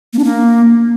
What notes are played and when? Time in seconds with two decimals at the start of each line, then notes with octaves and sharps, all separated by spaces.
0.13 A#3
0.19 D4
0.24 A#3